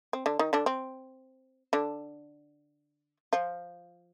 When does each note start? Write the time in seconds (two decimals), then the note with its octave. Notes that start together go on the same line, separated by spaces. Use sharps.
0.13 C4
0.26 D3 D4
0.39 D#3 D#4
0.53 D3 D4
0.66 C4
1.73 D3 D4
3.33 F3 F4